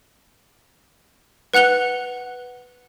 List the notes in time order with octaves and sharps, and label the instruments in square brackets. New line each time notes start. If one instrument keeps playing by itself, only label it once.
[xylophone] B4 F#5 F#6 F7 G7